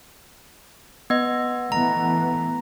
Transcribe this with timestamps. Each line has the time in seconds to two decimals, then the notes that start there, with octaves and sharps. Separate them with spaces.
1.10 B3 D#5
1.72 E3 A3 B3 A#5